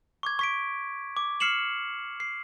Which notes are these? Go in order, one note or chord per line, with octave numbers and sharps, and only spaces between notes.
C#6 D6 G#6
C#6 B6 D7
D6
F6 C7 C#7 E7 F#7
C7